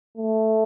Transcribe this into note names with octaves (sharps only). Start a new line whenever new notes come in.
A3